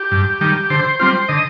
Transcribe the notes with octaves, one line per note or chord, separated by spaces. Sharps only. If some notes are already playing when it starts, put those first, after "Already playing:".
Already playing: G4
G2
D#3 G3
D3 C5
G3 C4 F4 C5
D3 D#5